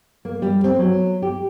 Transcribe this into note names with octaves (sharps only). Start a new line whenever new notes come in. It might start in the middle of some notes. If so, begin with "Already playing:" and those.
A#3
G3
C4
F#3
G4